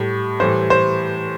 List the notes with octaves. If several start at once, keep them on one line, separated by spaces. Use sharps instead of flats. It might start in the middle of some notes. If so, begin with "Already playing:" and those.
Already playing: A2 G3
A2 E3 G3 C5
C5